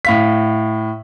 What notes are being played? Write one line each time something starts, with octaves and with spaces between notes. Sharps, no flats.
A2 F5 B6